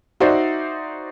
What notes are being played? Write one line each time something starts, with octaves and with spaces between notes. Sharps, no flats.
D#4 F#4 C5 D5 E5